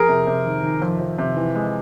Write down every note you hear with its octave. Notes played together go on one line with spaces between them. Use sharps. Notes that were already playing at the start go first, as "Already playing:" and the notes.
Already playing: F2 G#4 A#4
C3
C3
D#3
D#3
F2
F2
C3
E3
G#3